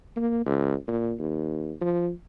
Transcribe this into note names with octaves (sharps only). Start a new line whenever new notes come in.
A#3
C#2
A#2
D#2
F3